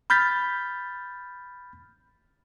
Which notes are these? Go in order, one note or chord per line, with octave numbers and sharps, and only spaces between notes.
B5 F6 G6 A6 B6